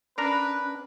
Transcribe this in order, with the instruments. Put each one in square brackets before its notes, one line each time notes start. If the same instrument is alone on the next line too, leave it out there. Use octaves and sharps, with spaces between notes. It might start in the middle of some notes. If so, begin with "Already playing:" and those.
[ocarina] C#4 [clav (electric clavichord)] D4 A#4 A#5 [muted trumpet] B4